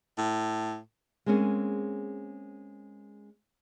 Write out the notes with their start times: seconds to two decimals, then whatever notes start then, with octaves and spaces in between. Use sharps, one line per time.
0.18 A2
1.26 G#3 A#3 C4 C#4 G#4